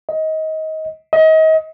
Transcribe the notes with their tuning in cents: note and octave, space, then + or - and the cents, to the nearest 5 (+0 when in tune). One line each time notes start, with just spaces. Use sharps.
D#5 +25
D#5 +35